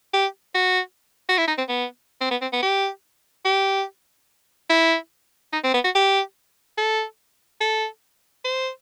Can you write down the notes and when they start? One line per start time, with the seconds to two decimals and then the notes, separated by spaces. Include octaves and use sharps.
0.14 G4
0.55 F#4
1.29 F#4
1.38 E4
1.48 D#4
1.58 C4
1.69 B3
2.21 C4
2.31 B3
2.42 C4
2.53 B3
2.62 G4
3.45 G4
4.70 E4
5.53 D#4
5.64 C4
5.74 B3
5.84 F#4
5.95 G4
6.78 A4
7.61 A4
8.44 C5